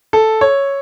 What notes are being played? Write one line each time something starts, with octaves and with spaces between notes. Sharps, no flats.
A4
C#5